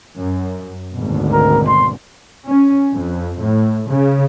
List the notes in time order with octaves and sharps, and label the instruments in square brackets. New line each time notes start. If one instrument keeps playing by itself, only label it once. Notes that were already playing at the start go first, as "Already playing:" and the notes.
[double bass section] F#2
G#1 D2 B2
[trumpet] A#4
C6
[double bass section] C#4
F2
A2
C#3